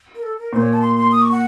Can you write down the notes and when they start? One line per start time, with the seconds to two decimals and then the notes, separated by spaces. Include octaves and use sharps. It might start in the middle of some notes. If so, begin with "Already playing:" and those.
0.15 A#4
0.23 A4
0.39 A#4
0.53 A#2 C5
0.62 C#5
0.73 A5
0.82 C6
0.97 C6
1.12 D#6
1.22 C#6
1.32 F#5